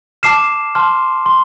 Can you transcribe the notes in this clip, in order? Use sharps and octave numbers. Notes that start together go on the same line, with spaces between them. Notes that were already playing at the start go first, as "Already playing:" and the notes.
A5 D6 F6 C7 E7
A5 C6 F6
C6